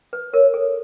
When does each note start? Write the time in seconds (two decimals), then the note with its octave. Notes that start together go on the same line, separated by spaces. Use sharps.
0.13 B4
0.34 A#4 C#5
0.54 A4